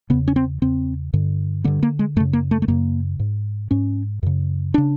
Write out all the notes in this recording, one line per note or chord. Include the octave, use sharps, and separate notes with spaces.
E2 C#3 B3
C#4
C4
E2 C#3 C4
G2 D3
G2 D3 B3
A#3
G#3
F#2 C#3 A3
A#3
A3
A3
F#2 C#3 A#3
G#2
G#2 C#4
F#2 C#3
C#3 D4